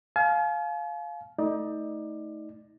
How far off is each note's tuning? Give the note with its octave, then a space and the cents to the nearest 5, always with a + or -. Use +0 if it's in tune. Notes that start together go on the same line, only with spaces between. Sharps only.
F5 +0 G#5 +45
A3 +0 D#4 +30 D5 +25